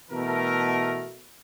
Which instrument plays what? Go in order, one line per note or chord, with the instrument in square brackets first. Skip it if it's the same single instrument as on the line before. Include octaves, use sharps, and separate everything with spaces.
[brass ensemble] B2 E3 A3 A#4